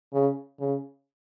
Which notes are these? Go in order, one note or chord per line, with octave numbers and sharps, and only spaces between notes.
C#3
C#3